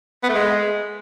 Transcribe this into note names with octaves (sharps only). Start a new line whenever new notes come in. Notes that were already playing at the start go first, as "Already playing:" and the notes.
B3
A3
G#3